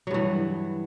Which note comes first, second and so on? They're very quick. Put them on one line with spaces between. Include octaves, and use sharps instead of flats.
F#3 G2 E3